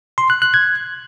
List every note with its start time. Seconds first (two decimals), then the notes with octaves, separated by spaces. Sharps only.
0.18 C6
0.30 F#6
0.42 F#6
0.54 G#6